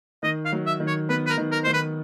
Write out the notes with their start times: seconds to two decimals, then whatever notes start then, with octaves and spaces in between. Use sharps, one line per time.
0.23 D#3 D#5
0.45 F5
0.52 F#3
0.66 E5
0.80 D#3
0.87 C#5
1.09 B3 B4
1.27 B4
1.30 A#4
1.38 D#3
1.52 A#4
1.64 D#3 C5
1.74 B4